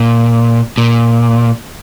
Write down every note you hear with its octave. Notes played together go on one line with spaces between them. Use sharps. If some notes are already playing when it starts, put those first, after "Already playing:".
Already playing: A#2
A#2